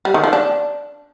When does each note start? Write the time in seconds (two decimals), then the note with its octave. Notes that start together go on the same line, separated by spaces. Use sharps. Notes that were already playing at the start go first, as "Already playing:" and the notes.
0.05 G3
0.14 D#3
0.24 F3
0.33 D4